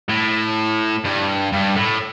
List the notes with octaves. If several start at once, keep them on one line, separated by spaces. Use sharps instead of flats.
A2
G2
G2
A2